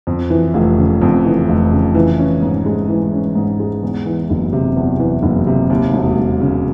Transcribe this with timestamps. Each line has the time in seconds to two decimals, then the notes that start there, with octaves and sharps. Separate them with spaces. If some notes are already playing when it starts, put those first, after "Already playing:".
0.07 F2
0.30 E3
0.54 F1
0.78 C#3
1.02 F2
1.25 E3
1.49 F1
1.72 C#3
1.95 E3
2.19 C#4
2.42 G#2
2.66 G#3
2.89 E3
3.13 C#4
3.35 G#2
3.60 G#3
3.83 E2
4.06 E3
4.30 F#1
4.53 C3
4.76 E2
4.99 E3
5.23 F#1
5.47 C3
5.70 D#2
5.93 E1
6.18 E1
6.41 C#3